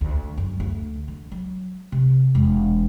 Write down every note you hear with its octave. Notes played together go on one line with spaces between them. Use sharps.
D2
F#2
D2
D3
F#3
C3
E1